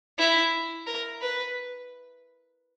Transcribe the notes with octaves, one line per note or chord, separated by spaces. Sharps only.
E4
A#4
B4